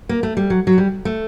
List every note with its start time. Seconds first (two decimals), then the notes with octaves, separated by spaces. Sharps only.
0.09 A#3
0.23 A3
0.37 G3
0.50 F#3
0.67 F#3
0.78 G3
1.05 A3